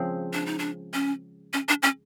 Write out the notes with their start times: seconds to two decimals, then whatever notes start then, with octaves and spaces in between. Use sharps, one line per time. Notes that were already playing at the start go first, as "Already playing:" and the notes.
Already playing: C#3 F3 G#3 C4
0.33 D4
0.46 D#4
0.59 D4
0.94 C#4
1.53 C#4
1.69 D4
1.83 C#4